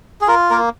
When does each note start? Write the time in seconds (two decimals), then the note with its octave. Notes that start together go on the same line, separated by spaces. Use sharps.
0.21 G#4
0.28 F4 A#4
0.50 A#3 A#4